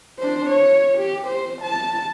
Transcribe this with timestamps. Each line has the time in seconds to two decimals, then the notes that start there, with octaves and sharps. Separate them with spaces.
0.19 D4 C5
0.49 C#5
0.98 G4
1.28 C5
1.62 A5